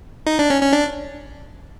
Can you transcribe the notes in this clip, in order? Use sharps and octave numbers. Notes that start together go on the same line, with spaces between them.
D#4
D4
C#4
C#4
D4